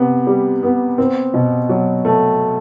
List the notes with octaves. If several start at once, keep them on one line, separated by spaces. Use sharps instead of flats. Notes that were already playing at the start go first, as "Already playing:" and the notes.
Already playing: C3 B3
G3
B3
C4
B2
F#3
A3